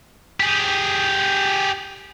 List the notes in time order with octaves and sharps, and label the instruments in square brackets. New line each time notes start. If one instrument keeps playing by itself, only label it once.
[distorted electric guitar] G4 G#4